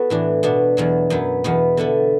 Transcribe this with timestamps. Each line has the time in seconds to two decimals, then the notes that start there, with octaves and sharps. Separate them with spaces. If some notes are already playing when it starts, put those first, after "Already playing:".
Already playing: B3 E4 F#4 A4
0.10 A2 E3 D4
0.43 B2 B3 D4
0.77 E2 B2 F#3
1.10 F#2 F#3 B3
1.44 E2 B2 B3
1.77 D3 B3 E4 A4